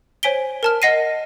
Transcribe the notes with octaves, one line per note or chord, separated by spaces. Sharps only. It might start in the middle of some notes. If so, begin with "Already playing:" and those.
C5 C#5 G#5 B6 D7 G7
A#4 A5 F6
D#5 F#5 A#6 C7 D#7